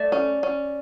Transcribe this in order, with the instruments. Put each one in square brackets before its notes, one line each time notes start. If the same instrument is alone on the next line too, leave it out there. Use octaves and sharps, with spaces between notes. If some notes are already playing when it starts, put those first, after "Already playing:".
Already playing: [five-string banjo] A3 [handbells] D5
[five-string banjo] C#4
C#4